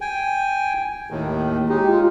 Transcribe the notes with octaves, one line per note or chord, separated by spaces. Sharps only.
G5 G#5
D#2 A2 D#3
G#3 D#4 G4
F4